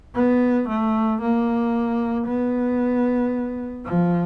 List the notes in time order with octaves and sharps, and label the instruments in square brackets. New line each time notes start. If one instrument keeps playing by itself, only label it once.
[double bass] B3
A3
A#3
B3
F3